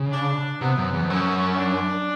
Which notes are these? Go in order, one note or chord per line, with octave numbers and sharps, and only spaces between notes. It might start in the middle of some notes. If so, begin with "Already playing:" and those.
Already playing: C#3
D4
C3 B3
F#2
E2
F2
F#2 C#4
D4